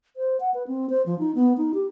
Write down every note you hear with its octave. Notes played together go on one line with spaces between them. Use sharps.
C5
F#5
B4
C4
C5
F3
D#4
B3
D#4
G4